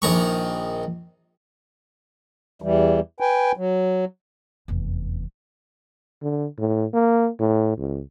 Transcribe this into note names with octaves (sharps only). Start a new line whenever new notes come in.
A#1 D#3 A#5 C#6
E2 E3 G3
B4 G5 G#5
F#3
F1 E2
D3
A2
A#3
A2
C#2